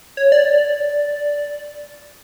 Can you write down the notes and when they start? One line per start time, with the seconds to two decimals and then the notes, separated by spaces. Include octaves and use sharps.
0.17 C#5
0.32 D5